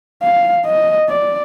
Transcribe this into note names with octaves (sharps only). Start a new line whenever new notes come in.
F5
D#5
D5